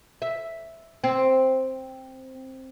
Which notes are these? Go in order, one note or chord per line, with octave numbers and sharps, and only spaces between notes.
E5
C4